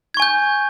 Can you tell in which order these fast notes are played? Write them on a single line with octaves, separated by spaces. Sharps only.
G#6 C#6 G#5 G6